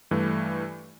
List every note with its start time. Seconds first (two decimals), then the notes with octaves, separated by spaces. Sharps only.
0.11 G2 E3 A3